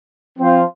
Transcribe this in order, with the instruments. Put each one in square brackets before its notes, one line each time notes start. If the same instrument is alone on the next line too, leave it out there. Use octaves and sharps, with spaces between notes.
[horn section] F3 C4 F4 C5